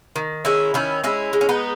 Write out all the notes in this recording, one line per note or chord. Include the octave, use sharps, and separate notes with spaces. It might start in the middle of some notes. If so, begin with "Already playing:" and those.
D#3
G#3 C#4 E4
D#3 C#4 E4
G#3 C#4 E4
G#3
C#4
B3 D#4